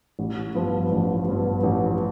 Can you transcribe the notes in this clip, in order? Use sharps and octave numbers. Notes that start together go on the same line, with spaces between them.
A1
G2 F3 B3
A1
G2 F3 B3
A1